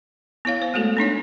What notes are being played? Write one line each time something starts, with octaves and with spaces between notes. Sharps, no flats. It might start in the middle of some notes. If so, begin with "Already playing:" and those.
B3 E4 C#5 F5
C5
G#3 A3 F#4 A4
B3 D4 D#4 C#5